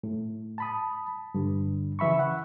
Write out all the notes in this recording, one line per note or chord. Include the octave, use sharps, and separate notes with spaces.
A2
A5 B5 D#6
G2 D3
C#3 E3 E5 B5 C#6
F#5